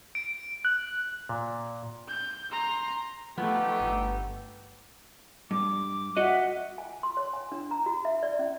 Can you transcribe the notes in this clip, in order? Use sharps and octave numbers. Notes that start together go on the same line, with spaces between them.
D7
F#6
A#2
G6
A#5 C6
F3 A3 B3 D#4 G4
G1
G2 D6
F#4 D#5 E5 F#5 F#6
G#5
C6
C#5
G#5
D4
A#5
F#4
E5
D5
C#4